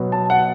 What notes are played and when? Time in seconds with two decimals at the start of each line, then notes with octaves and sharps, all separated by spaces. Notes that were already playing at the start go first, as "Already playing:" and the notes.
Already playing: B2 F#3 B3
0.12 A5
0.30 F#5